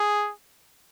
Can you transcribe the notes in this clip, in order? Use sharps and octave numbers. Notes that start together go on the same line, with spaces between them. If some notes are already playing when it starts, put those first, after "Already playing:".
Already playing: G#4